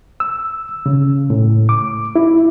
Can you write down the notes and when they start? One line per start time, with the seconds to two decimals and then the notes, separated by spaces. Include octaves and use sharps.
0.20 E6
0.86 C#3
1.30 A2
1.69 D6
2.16 E4